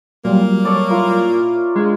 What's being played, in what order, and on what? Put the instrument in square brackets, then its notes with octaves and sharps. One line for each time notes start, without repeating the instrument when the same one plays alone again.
[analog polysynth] A#2 [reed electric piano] F#3 G3 [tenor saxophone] A#3
[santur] A4 C#5 D5
E4 F4 A#4
[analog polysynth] G#3 [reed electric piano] D4 F4